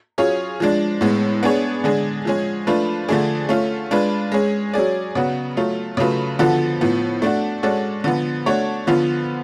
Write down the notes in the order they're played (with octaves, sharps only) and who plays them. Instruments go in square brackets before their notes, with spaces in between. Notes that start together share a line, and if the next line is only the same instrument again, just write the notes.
[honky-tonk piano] F#3 C#4 F4 G#4 C#5
F3 G#3 D4
A2 G#3 B3
B3 D4 G#4 C#5
D3 G#3 D4 G#4
F3 G#3 C#4 G#4
F3 A3 D4 F4 B4
D3 F3 A3 D4 G#4
A3 C#4 F4
G#3 D4 F4 B4
G#3 C#4 G#4
F#3 C#4 G#4 D5
C#3 F#3 B3 F#4
F#3 A3 F4
C#3 F#3 A3 F4 B4
D3 F3 B3 F#4 A4
A2 F3 B3
A3 D4 F#4
G#3 C#4 F#4 A4 D5
D3 F3 B3
A3 D4 F#4 C#5
D3 F3 B3 F4